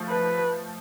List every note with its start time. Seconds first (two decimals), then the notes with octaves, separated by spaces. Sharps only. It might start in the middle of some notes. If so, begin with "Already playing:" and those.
Already playing: F3 A3
0.09 B4